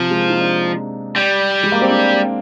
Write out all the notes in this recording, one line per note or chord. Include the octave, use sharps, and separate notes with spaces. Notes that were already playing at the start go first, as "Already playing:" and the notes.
Already playing: C3 F3
G#3
A#3
D#4
D4
G3
G#3
A#3
C4
D4